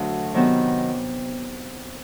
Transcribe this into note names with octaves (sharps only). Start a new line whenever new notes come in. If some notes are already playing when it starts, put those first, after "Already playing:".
Already playing: D2 F#3
C3 D#3 F#3 B3